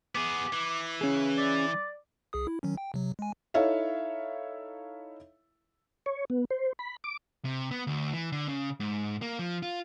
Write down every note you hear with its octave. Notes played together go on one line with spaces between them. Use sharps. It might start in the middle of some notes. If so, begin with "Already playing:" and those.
B3 G#4 D6
E3
C#4 G#4
D5
C2 G#4 D#6
E4
D#3 F#3 C#4
G5
C3 F#3
G#3 G#5
D#4 E4 A4 C#5 E5 F5
C#5
B3
C5
B5
D6
C3
B3
D2
E3
D3
C#3
G#2
A#3
F3
F4